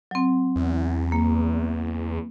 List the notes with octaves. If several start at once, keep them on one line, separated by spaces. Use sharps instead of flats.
F#3 C4
E2
A#3